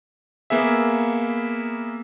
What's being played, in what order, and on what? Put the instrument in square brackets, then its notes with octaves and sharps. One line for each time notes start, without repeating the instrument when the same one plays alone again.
[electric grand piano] A#3 B3 G#4 E5